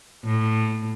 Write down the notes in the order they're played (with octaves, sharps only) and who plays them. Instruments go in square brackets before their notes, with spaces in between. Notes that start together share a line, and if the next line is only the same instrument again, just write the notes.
[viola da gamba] A2